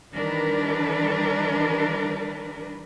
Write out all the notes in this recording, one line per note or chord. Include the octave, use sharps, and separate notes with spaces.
D#3 E3 G3 D4 A#4 B4